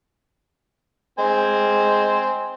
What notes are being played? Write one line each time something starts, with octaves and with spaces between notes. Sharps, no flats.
G#3 C4 C5 G#5